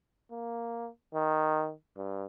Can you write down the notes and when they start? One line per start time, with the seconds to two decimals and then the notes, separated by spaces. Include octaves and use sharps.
0.31 A#3
1.14 D#3
1.97 G2